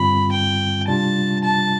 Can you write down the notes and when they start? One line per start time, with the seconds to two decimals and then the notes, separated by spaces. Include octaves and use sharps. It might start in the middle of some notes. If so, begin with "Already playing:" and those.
Already playing: G2 D3 G3 C4 F4 B5
0.32 G5
0.88 C3 G3 D4 F4 A5
1.44 A5